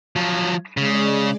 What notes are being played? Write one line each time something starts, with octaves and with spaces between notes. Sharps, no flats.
F3 F#3
C#3 G#3 D5